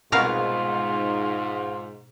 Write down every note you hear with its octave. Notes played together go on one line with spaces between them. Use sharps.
C2 G#2 B2 B3 F4 A#4 F5 C#6